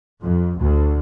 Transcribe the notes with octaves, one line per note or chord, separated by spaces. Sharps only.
F2
D2